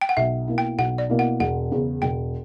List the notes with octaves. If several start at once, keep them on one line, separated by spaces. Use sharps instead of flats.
G5
F#5
B1 E5
B2 A#3 E4
G5
B1 F#5
D5
B2 A#3 E4
F#5
E1 F#5
E2 C#3
E1 G5